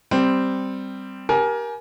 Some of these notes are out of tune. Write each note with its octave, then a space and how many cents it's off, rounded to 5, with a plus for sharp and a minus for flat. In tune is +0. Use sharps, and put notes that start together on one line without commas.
G3 +0 C4 -5
G4 +0 A#4 +15 G#5 +25